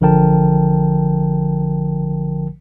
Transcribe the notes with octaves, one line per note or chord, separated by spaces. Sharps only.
A1 D3 F3 A#4 G5 A5